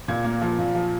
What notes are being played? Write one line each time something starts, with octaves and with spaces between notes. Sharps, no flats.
A#2 G#6
A#3
F3
A#2
F3